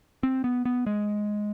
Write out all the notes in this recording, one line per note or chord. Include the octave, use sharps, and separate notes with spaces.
C4
B3
B3
G#3